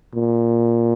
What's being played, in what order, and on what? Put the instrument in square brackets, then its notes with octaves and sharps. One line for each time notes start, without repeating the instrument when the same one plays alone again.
[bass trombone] A#2